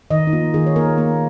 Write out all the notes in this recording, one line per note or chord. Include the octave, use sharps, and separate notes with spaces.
D#3 D#5
D#4
A#3 F4
D#3 G#4
C#5
A#3 A#4
A#3